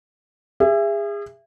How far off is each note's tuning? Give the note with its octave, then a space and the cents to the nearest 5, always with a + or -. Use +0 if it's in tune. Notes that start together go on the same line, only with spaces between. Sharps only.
G#4 -30 E5 +25